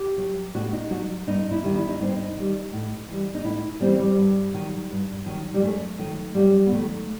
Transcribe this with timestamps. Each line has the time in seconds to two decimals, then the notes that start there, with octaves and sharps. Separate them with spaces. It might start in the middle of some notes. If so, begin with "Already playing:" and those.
Already playing: G4
0.18 F#3
0.54 A2 F#4
0.73 D#4
0.90 F#3 F#4
1.27 G2 D#4
1.51 E4
1.63 D#3 G3
1.76 E4
1.89 D#4
2.00 G2 C4
2.17 D#4
2.37 D#3 G3
2.73 A2
3.09 E3 G3
3.35 D#4
3.44 A2 E4
3.81 E3 G3 C4
3.99 G3
4.18 G2
4.54 D#3 F#3
4.91 G2
5.26 D#3 F#3
5.54 G3
5.62 F#2 A3
5.99 D#3 F#3
6.35 F#2 G3
6.66 B3
6.72 D#3 F#3 A3